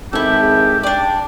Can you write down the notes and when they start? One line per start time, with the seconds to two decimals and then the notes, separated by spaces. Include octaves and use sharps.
0.13 G#1 E4 G4 A4
0.39 G#4
0.83 D4 D5 G5